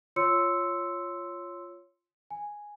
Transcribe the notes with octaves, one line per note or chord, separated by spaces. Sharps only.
F4 C#5 C6 E6 C#7
G#5